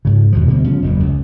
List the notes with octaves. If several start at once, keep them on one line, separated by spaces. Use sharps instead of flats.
G#2 C#3
D#2 B2 F3
B2 D3 G3 A#3
C#3 F3 G#3 C#4
F#1 E2 A#2
C#2